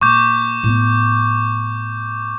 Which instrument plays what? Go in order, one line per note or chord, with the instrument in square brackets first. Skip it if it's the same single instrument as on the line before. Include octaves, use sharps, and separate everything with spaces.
[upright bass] A#2 [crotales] C#6 D6 G6
[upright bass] A2 B3